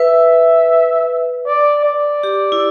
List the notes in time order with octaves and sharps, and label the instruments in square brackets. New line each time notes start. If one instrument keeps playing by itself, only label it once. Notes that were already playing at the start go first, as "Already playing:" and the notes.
Already playing: [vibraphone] B4 [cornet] E5
[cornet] D5
D5
[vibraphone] G4
E4